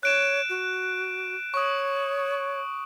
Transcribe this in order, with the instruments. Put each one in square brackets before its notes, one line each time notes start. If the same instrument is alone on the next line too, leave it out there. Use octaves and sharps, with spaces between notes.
[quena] C#5 [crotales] F#6 D7 E7
[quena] F#4
[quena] C#5 [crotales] C#6 D#6